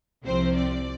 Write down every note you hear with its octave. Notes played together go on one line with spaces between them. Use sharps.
C2 C3 F3 C4 C5
D5